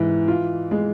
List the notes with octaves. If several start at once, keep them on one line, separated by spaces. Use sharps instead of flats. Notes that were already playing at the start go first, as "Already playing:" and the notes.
Already playing: G#2 E3
F4
G#3